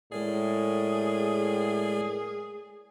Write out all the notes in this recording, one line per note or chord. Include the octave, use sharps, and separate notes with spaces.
A2 G#3 G#4 A#4 D5